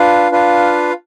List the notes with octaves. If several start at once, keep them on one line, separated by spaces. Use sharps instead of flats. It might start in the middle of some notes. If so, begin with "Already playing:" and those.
Already playing: D4 F4 B4 F5
D4 F4 B4 F5